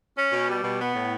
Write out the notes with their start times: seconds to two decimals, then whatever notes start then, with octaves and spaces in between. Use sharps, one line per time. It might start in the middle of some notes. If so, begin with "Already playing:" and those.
0.15 C#4
0.31 B2
0.47 G3
0.63 B2
0.79 B3
0.95 A2